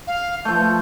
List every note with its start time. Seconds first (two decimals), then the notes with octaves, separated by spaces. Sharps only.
0.07 F5
0.45 F3 A3 G6